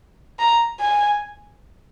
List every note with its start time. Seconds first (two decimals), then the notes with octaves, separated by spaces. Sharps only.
0.39 A#5
0.80 G#5